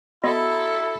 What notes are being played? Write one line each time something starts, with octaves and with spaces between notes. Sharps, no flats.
B3 E4 F#4 A4 D#5 B5 C6